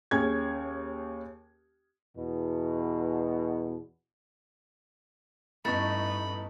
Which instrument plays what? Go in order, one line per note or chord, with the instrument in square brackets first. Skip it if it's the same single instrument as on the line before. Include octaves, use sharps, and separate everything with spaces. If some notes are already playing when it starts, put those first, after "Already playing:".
[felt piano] D#2 C#4 G#4 G#6
[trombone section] E2 B2
[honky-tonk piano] A1 B3 C#6 [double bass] G2 D#4 [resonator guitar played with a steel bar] A3 [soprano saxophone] B5